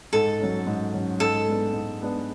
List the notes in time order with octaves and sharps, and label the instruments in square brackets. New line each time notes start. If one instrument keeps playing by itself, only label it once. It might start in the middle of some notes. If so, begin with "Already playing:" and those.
[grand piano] G#2 [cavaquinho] A4
[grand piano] F#3 C#4
G#2
F#3 C#4
[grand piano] G#2 [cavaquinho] A4
[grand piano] G#3 B3 D4
G#2
G#3 B3 D4